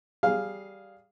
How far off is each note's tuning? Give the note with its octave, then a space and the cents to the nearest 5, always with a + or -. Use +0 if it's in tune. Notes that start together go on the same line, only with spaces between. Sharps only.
G3 -10 G#4 +0 F5 +0